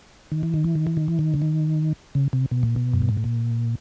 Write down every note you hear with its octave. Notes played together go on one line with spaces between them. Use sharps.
D#3
E3
D#3
E3
D#3
E3
D#3
E3
D#3
D3
D#3
C#3
C3
B2
A#2
B2
F#2
G2
G#2
A2
A#2